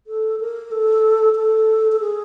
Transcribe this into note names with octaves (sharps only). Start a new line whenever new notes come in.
A4
A#4
A4
A4
A4
G#4